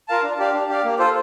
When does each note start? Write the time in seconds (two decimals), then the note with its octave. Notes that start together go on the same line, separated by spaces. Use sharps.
0.08 F4 A#4 F5 A5
0.23 D4
0.39 G4 D5 F5
0.53 D4
0.69 G4 D5 F5
0.84 A#3
0.99 F4 A4 C5